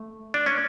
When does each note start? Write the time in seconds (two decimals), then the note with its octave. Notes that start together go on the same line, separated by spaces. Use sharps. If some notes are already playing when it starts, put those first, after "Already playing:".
Already playing: A3
0.34 D4
0.46 C#4